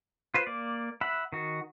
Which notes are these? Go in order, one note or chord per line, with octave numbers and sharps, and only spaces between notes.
F4 B4 C5
A#3 D5
E5 F#5 B5
D#3 F#4